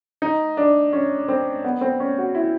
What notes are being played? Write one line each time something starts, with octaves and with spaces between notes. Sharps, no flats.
D#4
D4
C#4
C4
B3
C4
C#4
F#4
E4